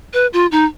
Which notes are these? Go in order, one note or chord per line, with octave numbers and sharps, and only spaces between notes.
B4
F4
D#4